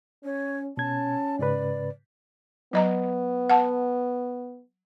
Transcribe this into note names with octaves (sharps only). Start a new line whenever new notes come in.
C#4 C#5
B2 C#4 A5 G#6
G#2 C#3 B4 D5
F#3 B3 D#5 A#5
F#5 A5